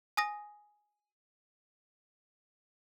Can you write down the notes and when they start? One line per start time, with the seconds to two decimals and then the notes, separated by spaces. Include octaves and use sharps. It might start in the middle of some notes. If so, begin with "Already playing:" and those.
0.17 G#5 D#6 A#6